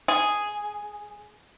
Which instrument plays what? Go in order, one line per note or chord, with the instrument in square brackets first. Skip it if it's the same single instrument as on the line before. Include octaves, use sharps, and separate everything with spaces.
[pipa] G#4